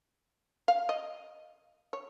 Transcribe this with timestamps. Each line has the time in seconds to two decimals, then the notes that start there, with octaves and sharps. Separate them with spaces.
0.68 F5
0.89 D#5
1.93 C#5